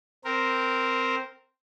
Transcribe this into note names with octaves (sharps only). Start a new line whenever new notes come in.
C4 A#4